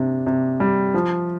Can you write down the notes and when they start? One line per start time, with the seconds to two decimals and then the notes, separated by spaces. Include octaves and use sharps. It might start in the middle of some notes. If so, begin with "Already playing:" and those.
Already playing: C3 D4
0.27 C3
0.60 G3
0.94 F3